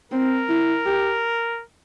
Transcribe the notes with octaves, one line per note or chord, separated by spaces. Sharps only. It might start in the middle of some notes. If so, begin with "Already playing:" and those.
C4 A#4
E4
G4